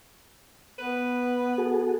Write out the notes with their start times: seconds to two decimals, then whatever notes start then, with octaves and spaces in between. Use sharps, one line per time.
0.78 B3 B4
1.58 F#4 G#4 A4